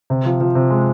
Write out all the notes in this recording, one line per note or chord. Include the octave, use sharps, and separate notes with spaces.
C3
F3
F3
C3
G#3